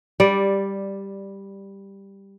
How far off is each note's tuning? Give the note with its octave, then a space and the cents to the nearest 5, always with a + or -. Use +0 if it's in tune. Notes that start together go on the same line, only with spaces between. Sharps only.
G3 +5 D5 +0